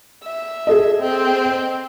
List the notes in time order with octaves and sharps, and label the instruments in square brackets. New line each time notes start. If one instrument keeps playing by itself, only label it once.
[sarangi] E5
[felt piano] G#4 A4 D#5
[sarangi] C4